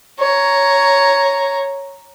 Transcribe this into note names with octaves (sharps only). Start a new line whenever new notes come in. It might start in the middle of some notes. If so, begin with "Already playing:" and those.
C#5 A#5